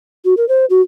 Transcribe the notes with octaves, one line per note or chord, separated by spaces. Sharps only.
F#4
A#4
C5
F#4